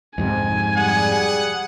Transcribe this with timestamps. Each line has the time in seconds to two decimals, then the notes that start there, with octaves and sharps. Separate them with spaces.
0.18 F2 G#2 C3 G#5
0.77 G3 G#4 F#5